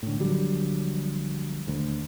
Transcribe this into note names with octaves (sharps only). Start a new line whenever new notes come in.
A2 D3
A#1 D3 F#3 G3
D#1 D2